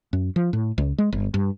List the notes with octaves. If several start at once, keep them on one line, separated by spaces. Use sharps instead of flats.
F#2
F3
A2
C#2
G#3
G1
G2